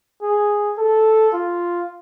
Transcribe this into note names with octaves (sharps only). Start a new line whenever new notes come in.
G#4
A4
F4